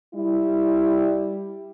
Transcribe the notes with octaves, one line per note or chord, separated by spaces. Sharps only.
G3 E4